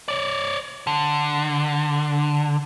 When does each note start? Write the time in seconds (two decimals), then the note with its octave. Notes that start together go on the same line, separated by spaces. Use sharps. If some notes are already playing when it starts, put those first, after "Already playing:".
0.08 C#5 D5
0.87 D3